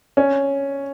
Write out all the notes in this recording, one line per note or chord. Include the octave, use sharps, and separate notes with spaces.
C#4